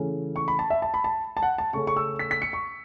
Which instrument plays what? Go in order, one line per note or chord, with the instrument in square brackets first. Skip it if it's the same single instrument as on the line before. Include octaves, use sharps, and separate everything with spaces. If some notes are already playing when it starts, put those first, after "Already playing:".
Already playing: [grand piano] C#3 E3 A3 C#4
C#6
B5
A5
E5
A5
B5
A5
A5
F#5
A5
C#3 A3 C#4 C#6
C#6
E6
B6
B6
C#7
C#6